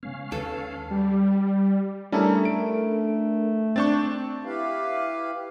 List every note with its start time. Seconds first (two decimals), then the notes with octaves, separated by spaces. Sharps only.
0.03 C#3 G#3 B3 C#4 F5
0.32 D#2 D#3 G#3 A4 B4
0.91 G3
2.12 G3 A3 C#4 D4 E4 A4 A#4
2.45 D7
3.76 C4 D4 C#6 G6 A6
4.45 E4 G4 B4 F5